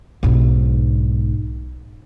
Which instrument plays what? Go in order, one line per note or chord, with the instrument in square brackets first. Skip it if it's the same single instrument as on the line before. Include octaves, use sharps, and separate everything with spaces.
[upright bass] B1 G#2